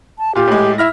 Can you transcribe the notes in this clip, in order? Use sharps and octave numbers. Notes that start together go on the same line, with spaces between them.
A5
A#2 F4 G4
A2 G#3
E4 E5 F6 A#6